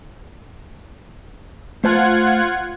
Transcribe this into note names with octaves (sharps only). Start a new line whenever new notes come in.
A3 F4 C5 F#5 A5 G#6